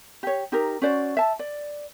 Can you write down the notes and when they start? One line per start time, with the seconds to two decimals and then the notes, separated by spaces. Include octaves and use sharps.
0.23 G4 C#5
0.52 D#4 G4 A#4
0.82 C#4 F#4 C5 D5
1.17 E5 A5
1.39 D5